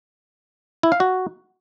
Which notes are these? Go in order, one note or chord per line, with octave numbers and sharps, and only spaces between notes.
E4
F5
F#4